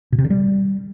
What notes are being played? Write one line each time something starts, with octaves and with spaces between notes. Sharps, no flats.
B2
C3
D3
G3